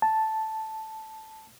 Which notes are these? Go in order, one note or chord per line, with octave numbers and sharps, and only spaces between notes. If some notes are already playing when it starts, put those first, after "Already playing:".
A5